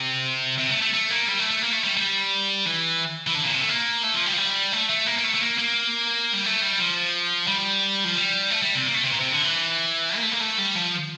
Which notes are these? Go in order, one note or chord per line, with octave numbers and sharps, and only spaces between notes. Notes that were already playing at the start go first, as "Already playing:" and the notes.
Already playing: C3
C3
A3
A3
A3
A#3
G3
A3
A3
A#3
A3
G3
G3
E3
E3
D3
A#2
C3
A3
A#3
A3
F3
G3
F3
G3
A3
A3
A#3
A#3
A3
A3
A#3
A#3
G3
A3
G3
F3
G3
F3
G3
A3
G3
C3
A#3
A3
C3
A#2
C3
D3
E3
A#3
A3
A#3
A3
G3
F3